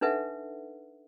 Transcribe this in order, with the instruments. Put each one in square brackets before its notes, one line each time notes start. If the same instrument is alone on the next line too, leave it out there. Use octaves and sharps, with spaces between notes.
[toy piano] D4 D#4 A4 B4 E5 F#5